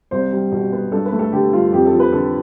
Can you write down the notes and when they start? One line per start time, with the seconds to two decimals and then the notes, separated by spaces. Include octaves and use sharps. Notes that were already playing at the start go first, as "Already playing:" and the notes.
0.11 C2 C5
0.32 G3
0.52 B2
0.73 B3
0.92 G2 A4
1.06 B4
1.13 A3
1.19 A4
1.32 D3 G4
1.53 G2 F4
1.72 F2 G4
1.86 A4
1.93 F3
2.00 B4
2.13 D3 A4